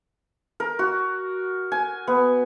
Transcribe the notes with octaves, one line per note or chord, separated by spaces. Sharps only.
A#4
F#4
G#5
B3